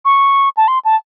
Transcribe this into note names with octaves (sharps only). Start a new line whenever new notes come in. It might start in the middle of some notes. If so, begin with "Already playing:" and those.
C#6
A5
C6
A5